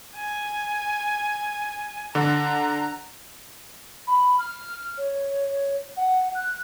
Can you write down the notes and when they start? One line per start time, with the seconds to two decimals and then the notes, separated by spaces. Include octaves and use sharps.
0.16 G#5
2.15 D3 A#5
4.07 B5
4.38 F6
4.97 C#5
5.96 F#5
6.34 F#6